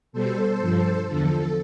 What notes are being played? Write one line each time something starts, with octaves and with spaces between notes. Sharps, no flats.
B2 G3 A4 C5
G2 F3
E2 D3 F3 A4